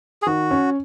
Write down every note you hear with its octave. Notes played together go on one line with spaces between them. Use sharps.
G#4
D#3 F#4
C#4